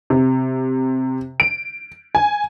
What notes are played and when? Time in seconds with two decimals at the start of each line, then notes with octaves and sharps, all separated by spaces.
0.10 C3
1.40 D7
2.15 G#5